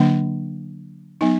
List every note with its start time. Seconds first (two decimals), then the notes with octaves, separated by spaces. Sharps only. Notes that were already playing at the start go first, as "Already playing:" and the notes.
Already playing: D3 F#3 A#3 D4
1.21 F#3 B3 D#4